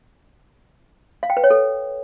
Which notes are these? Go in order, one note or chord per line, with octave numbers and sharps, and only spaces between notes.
F5
G5
B4
C#5
A4